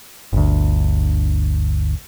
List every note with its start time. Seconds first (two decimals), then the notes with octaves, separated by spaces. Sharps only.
0.33 G1 D2